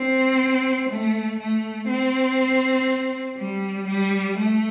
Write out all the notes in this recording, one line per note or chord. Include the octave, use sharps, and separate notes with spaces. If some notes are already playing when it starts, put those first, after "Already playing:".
Already playing: C4
A3
A3
C4
G3
G3
A3